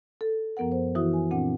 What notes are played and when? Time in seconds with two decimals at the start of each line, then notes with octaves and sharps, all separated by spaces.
0.21 A4
0.57 F#2 F3 B3 A#4 F#5
0.72 C5
0.95 E3 E4 F#4 D#6
1.13 G#5
1.31 A#2 C4 D4 F#5